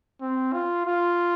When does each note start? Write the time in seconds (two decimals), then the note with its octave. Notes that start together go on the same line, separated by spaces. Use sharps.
0.21 C4
0.53 F4
0.86 F4